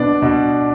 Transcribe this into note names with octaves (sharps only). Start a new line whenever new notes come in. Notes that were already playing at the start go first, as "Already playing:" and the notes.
Already playing: B2 B3 D4 D5
B2